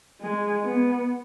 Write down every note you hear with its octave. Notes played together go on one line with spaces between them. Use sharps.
G#3
B3